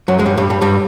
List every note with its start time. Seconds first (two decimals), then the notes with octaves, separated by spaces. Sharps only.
0.08 F#2 F#3
0.19 G#3
0.26 G2 G3
0.37 G2 G3
0.50 G2 G3
0.61 G2 G3